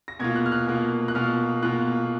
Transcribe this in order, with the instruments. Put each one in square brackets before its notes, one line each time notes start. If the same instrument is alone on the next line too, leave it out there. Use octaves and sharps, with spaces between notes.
[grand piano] A#6
B2 A#3 F4 G#6
F#6
F6
F#6
B2 A#3 F4
F#6
B2 A#3 F4 F6
B2 A#3 F4 F#6